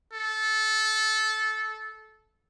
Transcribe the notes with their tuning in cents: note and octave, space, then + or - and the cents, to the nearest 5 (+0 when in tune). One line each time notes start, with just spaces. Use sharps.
A4 -20